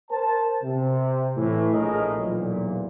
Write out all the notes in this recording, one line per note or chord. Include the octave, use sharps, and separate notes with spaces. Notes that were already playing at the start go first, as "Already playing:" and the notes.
A#4 C5 A5
C3
A2 E3
A#1 A2 G#4 A#4 D#5
B1 E2 A#2